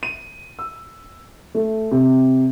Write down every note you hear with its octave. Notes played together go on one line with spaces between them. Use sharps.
D#7
E6
A3
C3